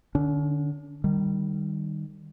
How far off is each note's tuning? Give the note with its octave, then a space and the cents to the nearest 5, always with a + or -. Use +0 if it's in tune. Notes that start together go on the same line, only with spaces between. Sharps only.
D3 +25 C#4 +45
D#3 -20 G3 +0